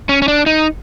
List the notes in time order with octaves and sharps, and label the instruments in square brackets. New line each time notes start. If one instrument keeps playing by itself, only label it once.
[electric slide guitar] C#4
C#4
D4
D#4